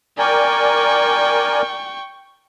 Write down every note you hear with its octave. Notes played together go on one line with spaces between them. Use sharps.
A#4 D5 G5 G#5 C#6